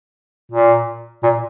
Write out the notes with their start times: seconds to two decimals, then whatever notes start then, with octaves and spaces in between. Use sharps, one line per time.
0.52 A#2
1.23 A#2